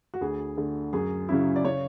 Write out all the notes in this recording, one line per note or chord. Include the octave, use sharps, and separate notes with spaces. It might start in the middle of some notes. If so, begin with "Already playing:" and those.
F#4
D2 G#4
D3 A3
F#2 G#4
C#3 F#3 C#4 E4
D5
C#3 C#5